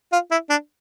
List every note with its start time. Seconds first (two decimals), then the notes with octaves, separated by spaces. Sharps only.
0.12 F4
0.31 E4
0.50 D4